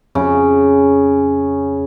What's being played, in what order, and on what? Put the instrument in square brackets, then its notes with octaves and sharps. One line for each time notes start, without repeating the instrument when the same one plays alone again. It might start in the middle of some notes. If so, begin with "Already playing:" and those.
[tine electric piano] F2 [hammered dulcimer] C#3